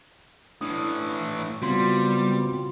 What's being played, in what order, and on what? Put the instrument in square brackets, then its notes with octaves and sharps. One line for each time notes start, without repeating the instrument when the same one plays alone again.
[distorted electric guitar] A2 E3 [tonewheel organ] D4 [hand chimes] D#6
[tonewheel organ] C#3 B3 C4 [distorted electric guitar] G3 [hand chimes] F4 F#4 C6